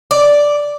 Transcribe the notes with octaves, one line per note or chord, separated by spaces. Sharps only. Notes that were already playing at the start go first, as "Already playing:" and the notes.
D5